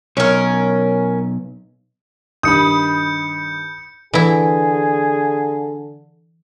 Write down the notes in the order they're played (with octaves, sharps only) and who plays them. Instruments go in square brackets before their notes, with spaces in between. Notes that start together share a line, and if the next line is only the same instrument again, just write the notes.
[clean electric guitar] B1 [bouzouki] C#4 A#4
[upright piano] G2 D#3 [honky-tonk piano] B5 D#6 [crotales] G6 C#7
[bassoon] D3 [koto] E3 E4 [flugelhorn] G#4